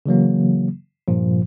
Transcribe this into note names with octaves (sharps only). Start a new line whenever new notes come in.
C#3 E3 F#3 A#3
G2 A#2 F3